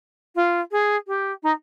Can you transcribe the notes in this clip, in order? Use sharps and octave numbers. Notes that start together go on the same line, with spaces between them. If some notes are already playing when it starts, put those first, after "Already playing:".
F4
G#4
G4
D#4